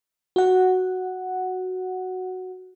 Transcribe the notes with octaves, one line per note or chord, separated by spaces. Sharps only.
F#4 F#5